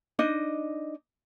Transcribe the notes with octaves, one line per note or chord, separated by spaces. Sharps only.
D4 D#4 D#5